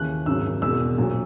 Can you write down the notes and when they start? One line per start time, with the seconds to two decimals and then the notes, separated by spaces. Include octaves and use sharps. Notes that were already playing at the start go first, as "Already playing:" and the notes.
Already playing: D#2 C#3 E3 F#6
0.26 G#1 F#2 C#3 F#3 E6
0.62 E1 E2 B2 E6
0.98 A#1 A#2 F#3